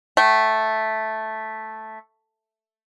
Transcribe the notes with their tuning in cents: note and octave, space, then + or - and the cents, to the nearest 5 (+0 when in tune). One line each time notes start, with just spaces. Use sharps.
A3 -5 G5 -35